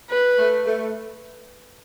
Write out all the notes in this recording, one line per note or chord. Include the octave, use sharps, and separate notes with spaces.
B4
A3
A3